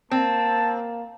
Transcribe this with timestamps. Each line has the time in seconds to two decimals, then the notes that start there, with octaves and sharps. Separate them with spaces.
0.11 A#3 C4 A5